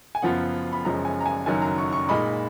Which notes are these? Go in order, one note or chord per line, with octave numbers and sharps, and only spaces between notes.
G#5
F#1 F#2 F3 B3 F4 F#5
B5
F#1 F#2 F3 G#3 C#4 A#5
G#5
A#5
G#5
F#1 F#2 D#3 F#3 G#5
A#5
C#6
C#6
A#2 G#3 D#4 B5